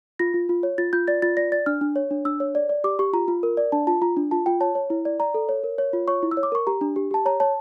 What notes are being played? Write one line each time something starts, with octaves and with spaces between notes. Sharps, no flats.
F4 A#6
F4
F4
C#5
F4 A6
F4 G6
D5 A6
F4 A6
D5 A#6
D5 A6
D4 F6
D4
C#5
D4
D4 E6
C#5
D5
D5
G4 D6
G4 C#6
F4 A#5
F4
A#4
D5
D4 A5
F4 A5
F4 A#5
D4
F4 A5
F4 G5
C#5 A5
C#5
E4
D5
D5 A#5
A4
C#5
A#4
C#5
F4
C#5 C#6
E4
E6
C#5
D6
A#4 C#6
G4 A#5
D4
G4
G4 A5
C#5 A#5
C#5 A5